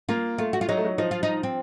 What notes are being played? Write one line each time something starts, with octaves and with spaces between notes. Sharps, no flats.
A#3 F4
A3 F4
F#4
F4
F#3 D#4
A3
F#3
F3 D#4
F4
D#4
C4